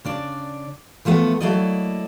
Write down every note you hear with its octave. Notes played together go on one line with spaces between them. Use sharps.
C#3 D4 D5
E3 F3 A3 B3
F#3 A3 A#3 E4 D5 D#5